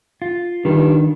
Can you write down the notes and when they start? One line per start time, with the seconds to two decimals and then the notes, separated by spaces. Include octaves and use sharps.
0.22 F4
0.64 G2 D#3